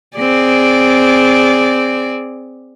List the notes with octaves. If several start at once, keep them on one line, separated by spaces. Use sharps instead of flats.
C4 G#4 D5